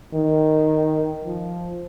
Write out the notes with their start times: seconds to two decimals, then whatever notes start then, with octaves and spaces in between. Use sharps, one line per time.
0.15 D#3
1.25 F3